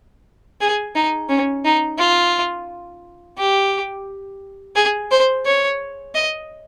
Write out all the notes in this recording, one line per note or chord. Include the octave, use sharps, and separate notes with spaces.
G#4
D#4
C#4
D#4
F4
G4
G#4
C5
C#5
D#5